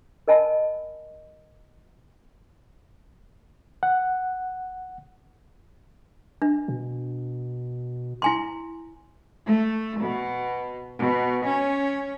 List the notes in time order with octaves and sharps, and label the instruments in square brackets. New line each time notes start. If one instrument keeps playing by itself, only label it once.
[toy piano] A#4 D#5 G#5 A5 B5
[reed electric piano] F#5
[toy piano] D4
[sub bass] B2
[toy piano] E4 G#5 C6
[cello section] A3
B2
B2
C#4